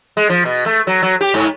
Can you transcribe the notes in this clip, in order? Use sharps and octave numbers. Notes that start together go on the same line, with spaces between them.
G#3
F3
B2
A3
F#3
F#3
G4
G#2